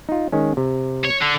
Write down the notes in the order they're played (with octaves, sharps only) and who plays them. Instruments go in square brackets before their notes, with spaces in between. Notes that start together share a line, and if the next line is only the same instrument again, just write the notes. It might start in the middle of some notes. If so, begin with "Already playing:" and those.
[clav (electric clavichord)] D#4 F4
D#3 G#3 C#4
C3
[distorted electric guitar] C#5
D3